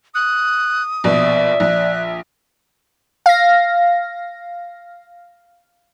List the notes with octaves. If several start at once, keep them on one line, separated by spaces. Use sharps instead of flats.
D#6 F#6
A#1 B2 D5 E5
A#1 F#6
F5 A#6